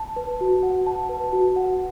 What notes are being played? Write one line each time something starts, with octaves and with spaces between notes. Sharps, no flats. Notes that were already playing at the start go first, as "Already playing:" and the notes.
Already playing: A5
B4
F#4
F#5
A5
B4
F#4
F#5